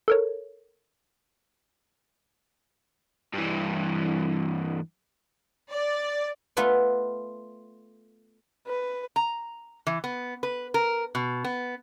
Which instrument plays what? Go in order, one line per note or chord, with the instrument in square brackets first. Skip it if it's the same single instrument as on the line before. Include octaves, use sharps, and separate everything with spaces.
[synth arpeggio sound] A4 A#4 C#5
[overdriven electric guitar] G2 E3
[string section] D5
[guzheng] A3 B3 F4 A4 B4 D5
[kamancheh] B4
[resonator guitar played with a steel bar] A#5
E3
B3
B4
A#4
B2
B3